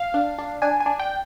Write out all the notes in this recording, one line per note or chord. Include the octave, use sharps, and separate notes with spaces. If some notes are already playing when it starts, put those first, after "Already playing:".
Already playing: F5
D4
D4
D4 G#5
G#5
D4
G5